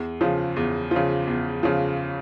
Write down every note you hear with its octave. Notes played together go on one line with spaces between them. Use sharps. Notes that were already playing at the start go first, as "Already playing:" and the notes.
Already playing: E2
C#3 F3
E2
C#3 F3
E2
C#3 F3